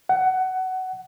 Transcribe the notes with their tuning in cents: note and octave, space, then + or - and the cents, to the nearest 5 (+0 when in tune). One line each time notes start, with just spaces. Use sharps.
F#5 +15